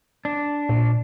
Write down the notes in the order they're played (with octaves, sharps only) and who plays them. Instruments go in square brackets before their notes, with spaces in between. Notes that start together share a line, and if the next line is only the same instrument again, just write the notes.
[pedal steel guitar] D4
[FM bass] A#2